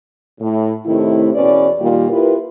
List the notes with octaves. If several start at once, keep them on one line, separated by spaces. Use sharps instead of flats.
A2
A2 C3 D#3 A3 E4
E2 B2 C#4 B4 D5
A#2 D#3 G3 A#3 F4 G4
E4 F4 G4 A#4 B4